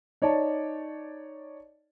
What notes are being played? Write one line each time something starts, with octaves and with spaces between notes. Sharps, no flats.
D#4 C#5 D5 A5